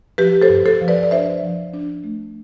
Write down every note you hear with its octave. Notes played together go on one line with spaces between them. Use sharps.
F3 G4 B4
A4 C5
G2
A4 C5
F3
B4 D5
D5
D4 C5 E5
F3
D4
A3